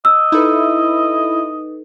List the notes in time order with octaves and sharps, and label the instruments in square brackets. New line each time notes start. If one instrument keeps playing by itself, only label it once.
[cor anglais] D#5 [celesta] E6
[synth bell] D#4 A4 B4 [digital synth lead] E4